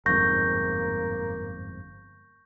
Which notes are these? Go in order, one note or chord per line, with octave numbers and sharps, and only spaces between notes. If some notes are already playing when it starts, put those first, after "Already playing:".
G1 F2 G#2 A#3 C#6 G6 A#6